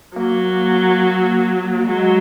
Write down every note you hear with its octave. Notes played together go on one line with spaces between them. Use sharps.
F#3 A#3
A#3
F#3 G#3